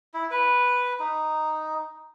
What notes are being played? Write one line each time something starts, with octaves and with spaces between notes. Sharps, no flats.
E4
B4
D#4